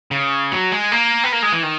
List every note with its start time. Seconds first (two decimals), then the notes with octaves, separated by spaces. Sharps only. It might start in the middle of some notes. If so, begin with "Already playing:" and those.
0.11 C#3
0.52 F#3
0.72 G#3
0.92 A#3
1.24 B3
1.32 A#3
1.43 G#3
1.53 E3
1.63 D#3